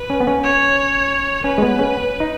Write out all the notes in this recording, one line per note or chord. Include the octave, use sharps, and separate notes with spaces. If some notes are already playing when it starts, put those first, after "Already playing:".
Already playing: B4
C#4
B3
C#4
C#5
C#4 B4
G#3
B3
C#4
D#4